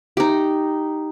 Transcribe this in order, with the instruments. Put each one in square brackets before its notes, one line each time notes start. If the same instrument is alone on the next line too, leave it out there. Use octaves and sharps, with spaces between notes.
[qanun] D#4 G4